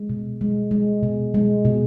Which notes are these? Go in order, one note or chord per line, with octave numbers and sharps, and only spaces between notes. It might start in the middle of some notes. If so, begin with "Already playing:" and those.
Already playing: G#3
B2
G#3
G#3
B2
G#3
B2